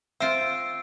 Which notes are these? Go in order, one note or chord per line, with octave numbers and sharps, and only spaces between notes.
C4 F4 E5 E6 C7 D7